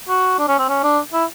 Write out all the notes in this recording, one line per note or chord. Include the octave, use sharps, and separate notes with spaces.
F#4
D4
C#4
C4
C#4
D4
E4